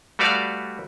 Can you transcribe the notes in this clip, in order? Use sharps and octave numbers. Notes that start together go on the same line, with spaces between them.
G3 A3 F#4 B4 D5 F5